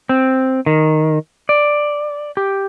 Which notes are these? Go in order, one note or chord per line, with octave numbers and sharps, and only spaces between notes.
C4
D#3
D5
G4